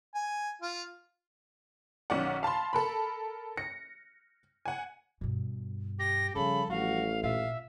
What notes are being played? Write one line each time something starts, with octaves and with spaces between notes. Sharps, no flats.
G#5
F4
B1 D#3 C#4 D5 F#5
F5 A5 B5 C6
A4 A#4 B5
A#6 C#7
F#5 G#5
G2 B2
G4 A#6
C#3 F3 G3 A4 B5
A1 F#4 F5
A#2 E5 F5